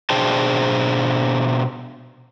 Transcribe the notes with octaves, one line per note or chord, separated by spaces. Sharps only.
B2 D4 G#4 C5 G5 A5